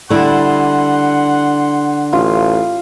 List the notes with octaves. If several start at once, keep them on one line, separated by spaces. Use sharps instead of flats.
D3 G3 E4 F#5 C6
A1 F4